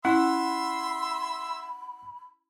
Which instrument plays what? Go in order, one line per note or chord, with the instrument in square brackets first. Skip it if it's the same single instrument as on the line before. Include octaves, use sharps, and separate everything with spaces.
[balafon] C#4 E4 [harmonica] E5 C6 E6 [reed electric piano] F#5 [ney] B5